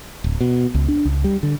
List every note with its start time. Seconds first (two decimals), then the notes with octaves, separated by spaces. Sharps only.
0.24 D1
0.41 B2
0.74 C#2
0.88 D4
1.05 C#2
1.24 G3
1.43 D3